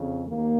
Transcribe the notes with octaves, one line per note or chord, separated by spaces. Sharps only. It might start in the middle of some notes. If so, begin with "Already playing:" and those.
Already playing: F2 C#3
D#2 A#3